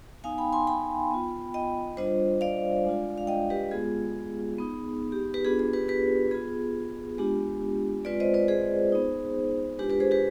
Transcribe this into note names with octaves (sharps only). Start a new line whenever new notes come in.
B3 D#4 F5 G#5
G5 B5
G#5 C6
G5 B5
B3 F4
D#5 G5
G3 D4 F4 C5 D#5
D5 F5
G#3 D4 F4
F5
D#5 G5
G4 B4
G#3 B3 F4 G#4
B3 D#4
G4
G4 B4
B3 D4 F4 G#4
G#4
G4 B4
G4 B4
B3 F4 G#4
G#3 B3 D4 F4 G4
G#3 C4 F4 B4 D5
C5 D#5
B4 D5
G#4 C5
B3 D#4
G#3 D4 F4 G4 B4
G4 B4
G#4 C5
G4 B4